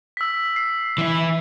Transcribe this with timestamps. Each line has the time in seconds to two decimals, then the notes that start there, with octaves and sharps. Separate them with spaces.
0.17 E6 B6
0.56 C7
0.98 E3 E4